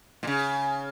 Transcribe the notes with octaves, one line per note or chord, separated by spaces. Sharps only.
A#2
C#3